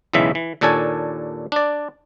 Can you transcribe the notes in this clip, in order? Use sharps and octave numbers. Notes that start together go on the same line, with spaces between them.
B1 E2 C#3 E3 G#3 E5
E3
D#2 A#2 D4 A4 C#5 G#5
D4 D5